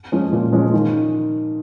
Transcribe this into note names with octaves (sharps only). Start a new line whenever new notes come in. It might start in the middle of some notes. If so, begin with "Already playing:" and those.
F3 G#3 C#4
A#2
F3 G#3 C#4
D#3